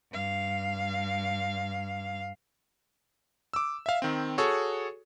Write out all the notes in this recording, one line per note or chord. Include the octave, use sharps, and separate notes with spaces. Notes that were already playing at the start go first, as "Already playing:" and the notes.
G2 F5
D6 E6
E5 F5
D#3 C4
F#4 G#4 A4 C#5 C#6